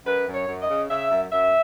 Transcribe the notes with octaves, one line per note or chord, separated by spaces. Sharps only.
F#2 B4
F#2
C#5
F#2
D#5
C#3
C#3 E5
F#2
F#2 E5